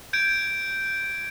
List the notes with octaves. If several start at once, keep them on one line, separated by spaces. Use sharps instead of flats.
G6 G#6 D7